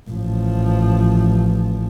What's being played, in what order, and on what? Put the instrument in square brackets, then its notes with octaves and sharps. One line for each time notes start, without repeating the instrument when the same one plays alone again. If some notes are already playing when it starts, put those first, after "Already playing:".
[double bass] A1 F3